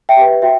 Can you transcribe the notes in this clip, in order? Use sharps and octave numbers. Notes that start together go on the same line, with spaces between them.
E5 G5
G4 B4
F#4 E5 G5